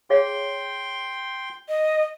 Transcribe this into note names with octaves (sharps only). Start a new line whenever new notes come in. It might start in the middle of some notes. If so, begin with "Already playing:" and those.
G#4 C#5 F5 G5 C6
D#5